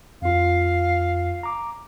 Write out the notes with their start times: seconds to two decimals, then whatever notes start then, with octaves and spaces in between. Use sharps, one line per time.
0.22 F2 F4 F5
1.43 A#5 D6